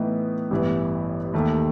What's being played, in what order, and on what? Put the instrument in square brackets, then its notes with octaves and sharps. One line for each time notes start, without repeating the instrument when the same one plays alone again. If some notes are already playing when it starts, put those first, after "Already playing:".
Already playing: [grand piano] A2 E3 B3 D#4
A1 G2 E3 B3
D#2 D#3 A3